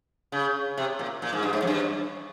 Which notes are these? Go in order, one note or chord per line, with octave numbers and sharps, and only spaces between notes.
C#3
C3
A#2
A#2
G#2
G2
G#2
F2
G2